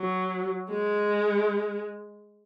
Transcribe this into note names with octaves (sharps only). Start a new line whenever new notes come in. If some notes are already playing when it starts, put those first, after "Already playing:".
Already playing: F#3
G#3